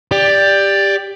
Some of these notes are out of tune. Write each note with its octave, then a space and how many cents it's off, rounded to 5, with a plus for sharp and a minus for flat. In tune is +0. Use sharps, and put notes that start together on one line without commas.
G4 +15 D5 +0